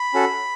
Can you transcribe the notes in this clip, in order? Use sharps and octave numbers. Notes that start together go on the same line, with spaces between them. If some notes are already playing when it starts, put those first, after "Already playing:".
Already playing: B5
C#4 F#4 A4